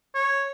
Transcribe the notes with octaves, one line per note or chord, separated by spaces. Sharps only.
C#5